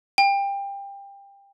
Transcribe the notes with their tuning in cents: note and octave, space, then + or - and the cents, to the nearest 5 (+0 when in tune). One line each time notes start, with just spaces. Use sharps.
G5 +25